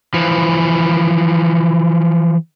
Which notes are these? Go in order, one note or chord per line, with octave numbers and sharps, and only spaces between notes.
E3 F3